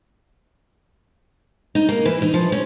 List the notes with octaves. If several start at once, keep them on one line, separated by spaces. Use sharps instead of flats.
D#4
A#3
E3
D#4
F3
C#4